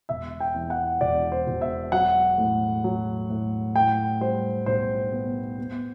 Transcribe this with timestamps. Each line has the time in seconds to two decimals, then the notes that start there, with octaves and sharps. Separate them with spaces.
0.09 E1 E5
0.40 G5
0.54 E2
0.70 F#5
1.01 E1 D5
1.32 C5
1.47 E1
1.61 E5
1.92 F#3 F#5
2.38 A2
2.84 F#3
3.30 A2
3.76 A2 G5
4.21 G3 C5
4.66 B1 C5
5.12 B3
5.58 B3